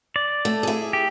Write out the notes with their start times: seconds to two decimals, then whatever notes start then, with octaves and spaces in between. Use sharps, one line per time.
0.16 D5
0.45 A3
0.63 E4 G#4
0.93 G4